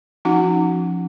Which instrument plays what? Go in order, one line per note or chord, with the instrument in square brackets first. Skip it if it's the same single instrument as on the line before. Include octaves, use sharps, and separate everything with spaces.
[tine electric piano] F3 C#4 [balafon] D#4 F#4 F#5